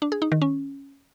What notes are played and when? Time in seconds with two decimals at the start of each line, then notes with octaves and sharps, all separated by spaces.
0.02 D4
0.12 G#4
0.22 D#4
0.32 D#3
0.42 C#4